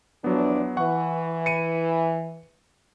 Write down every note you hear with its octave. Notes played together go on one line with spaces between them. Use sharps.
E2 F3 F#3 B3 D4
E3 F#5 C#6
C#7 D#7